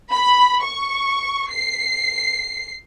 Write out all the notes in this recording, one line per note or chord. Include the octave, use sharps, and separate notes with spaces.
B5
C#6
C7